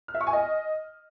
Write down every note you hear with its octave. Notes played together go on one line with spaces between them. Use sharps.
F6
E5
C#6
G#5
D#5